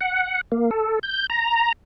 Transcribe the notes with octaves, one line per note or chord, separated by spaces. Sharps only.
F#5
A#3
A4
G6
A#5